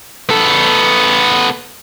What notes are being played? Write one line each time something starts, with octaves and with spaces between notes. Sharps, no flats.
B3 A4